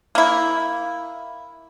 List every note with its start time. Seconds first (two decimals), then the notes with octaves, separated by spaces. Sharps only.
0.15 A#3 E4